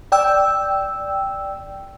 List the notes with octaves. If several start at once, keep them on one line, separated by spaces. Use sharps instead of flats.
D5 G5 E6